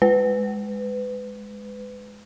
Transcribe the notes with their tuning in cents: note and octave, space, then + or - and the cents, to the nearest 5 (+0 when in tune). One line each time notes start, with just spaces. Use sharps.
G#3 +0 B4 +25